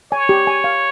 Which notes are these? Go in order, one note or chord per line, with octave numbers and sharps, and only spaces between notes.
C#5 G#5
G4
G#5
F5